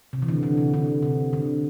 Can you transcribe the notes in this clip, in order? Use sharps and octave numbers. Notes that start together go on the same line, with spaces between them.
C3
E3
D3
D3
C3
D3
C3
D3